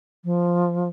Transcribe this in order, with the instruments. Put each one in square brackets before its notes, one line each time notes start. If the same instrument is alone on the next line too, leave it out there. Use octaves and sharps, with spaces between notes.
[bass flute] F3